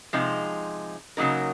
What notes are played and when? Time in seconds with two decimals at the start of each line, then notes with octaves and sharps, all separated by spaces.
0.13 C3 F3 G#3 D#4
1.17 C#3 F#3 A#3 D#4 A#4